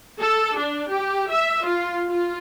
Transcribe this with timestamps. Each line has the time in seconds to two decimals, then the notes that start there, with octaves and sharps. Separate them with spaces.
0.20 A4
0.58 D4
0.92 G4
1.31 E5
1.66 F4
2.09 F4